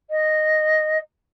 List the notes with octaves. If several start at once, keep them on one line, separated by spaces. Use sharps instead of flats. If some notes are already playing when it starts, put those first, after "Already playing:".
D#5